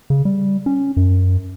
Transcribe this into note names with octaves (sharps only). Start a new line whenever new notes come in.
C#3
G3
C#4
F#2